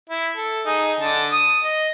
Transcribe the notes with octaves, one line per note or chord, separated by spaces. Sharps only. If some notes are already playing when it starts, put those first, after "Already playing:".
E4
A4
D#4 G#4
D3 A5
D#6
D#5